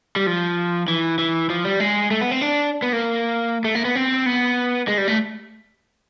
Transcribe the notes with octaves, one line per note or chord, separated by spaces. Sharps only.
G3
F3
E3
E3
F3
G3
G#3
A3
B3
C4
D4
B3
A#3
A3
A#3
B3
C4
B3
G#3
G3
A3